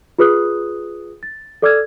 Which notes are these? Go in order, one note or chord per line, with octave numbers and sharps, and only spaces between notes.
F4 G#4 B4 D#6 F#6
A6
A4 D5 D6 E6 F6 G#6